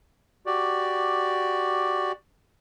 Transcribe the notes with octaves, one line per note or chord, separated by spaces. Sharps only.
F#4 G4 D5